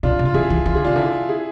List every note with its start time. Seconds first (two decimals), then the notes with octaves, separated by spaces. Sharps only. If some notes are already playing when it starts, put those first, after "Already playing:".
0.03 B2 D4 F4
0.19 C3
0.25 F4
0.34 E3 E4 G#4
0.50 E3
0.66 E3 F4
0.75 D3 G#4
0.84 C3 D4 F4
0.96 D3 E4
1.29 E4 G#4